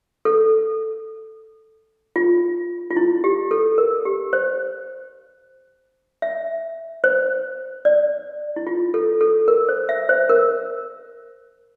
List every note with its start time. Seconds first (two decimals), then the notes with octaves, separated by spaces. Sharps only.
0.25 A4
2.16 F4
2.91 F4
2.96 E4
3.24 G4
3.51 A4
3.78 A#4
4.05 G4
4.33 C5
6.22 E5
7.04 C5
7.85 D5
8.56 E4
8.67 F4
8.94 A4
9.21 A4
9.48 A#4
9.69 C5
9.89 E5
10.09 C5
10.29 A#4